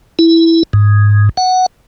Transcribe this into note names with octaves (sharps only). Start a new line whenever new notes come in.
E4
G#2
F#5